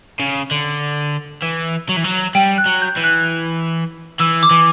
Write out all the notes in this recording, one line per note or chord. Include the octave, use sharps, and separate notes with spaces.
C#3
D3
E3
F#3
E3
F#3
G3 G5
F#6
F#3
G6
E3
F#6
E3 E6
D6
E3